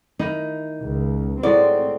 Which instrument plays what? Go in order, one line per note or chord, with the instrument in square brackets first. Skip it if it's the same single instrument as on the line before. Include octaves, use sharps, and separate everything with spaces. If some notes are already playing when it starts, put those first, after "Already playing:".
[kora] D#3 E4 [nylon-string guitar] D#4
[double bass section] C#2
[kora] A2 F#3 G#3 [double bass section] C4 [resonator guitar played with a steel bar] D5